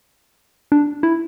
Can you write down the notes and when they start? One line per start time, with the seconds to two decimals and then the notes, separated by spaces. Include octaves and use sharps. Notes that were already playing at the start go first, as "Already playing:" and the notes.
0.72 D4
1.03 E4